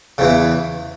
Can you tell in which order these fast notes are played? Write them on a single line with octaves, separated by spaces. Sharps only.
C#3 E2 E3